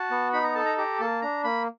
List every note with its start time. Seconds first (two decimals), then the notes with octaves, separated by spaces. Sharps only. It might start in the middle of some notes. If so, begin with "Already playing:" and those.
Already playing: F#4 A5
0.11 B3
0.33 D#4 B5
0.44 A#5
0.55 A4 A5
0.65 A#5
0.78 G4 A#5
1.00 A#3 A5
1.22 D4 A#5
1.44 A#3 B5